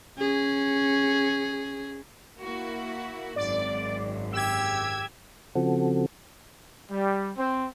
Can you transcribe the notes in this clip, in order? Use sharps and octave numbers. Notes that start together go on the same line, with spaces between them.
C#4 G#4
A#3 E4 F#4
G#1 F#2 D5
G4 E6 G#6
C#3 F3 C4 F#4 A4
G3
C4